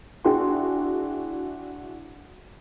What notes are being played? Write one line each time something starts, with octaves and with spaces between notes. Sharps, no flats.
D4 E4 F#4 G#4 G5 C6